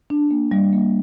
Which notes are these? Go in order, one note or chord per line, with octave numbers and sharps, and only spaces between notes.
D4
A#3
G3
A#3